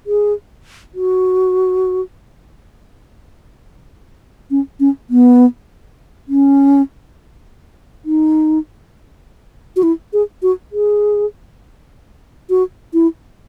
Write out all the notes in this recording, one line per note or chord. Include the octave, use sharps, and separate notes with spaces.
G#4
F#4
C#4
C#4
B3
C#4
D#4
F#4
E4
G#4
F#4
G#4
F#4
E4